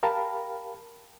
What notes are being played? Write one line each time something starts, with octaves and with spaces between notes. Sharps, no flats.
G4 A#4 F5 G5 A5 B5